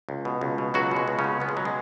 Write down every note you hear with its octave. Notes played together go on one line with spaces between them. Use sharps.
C#2
B2
C#2
B2
C#2 F#3 F#4
B2
G#3
C#2
C#3 C#4
B2
C#2 B3
G#3
B2 F#3
G#3